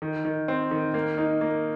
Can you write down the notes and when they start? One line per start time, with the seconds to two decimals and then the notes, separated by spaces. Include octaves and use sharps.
0.02 D#3
0.25 D#3
0.48 C4
0.71 D#3
0.94 A#3
1.18 D#4
1.41 A#3